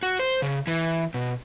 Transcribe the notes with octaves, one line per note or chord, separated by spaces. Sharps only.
F#4
C5
C#3
E3
B2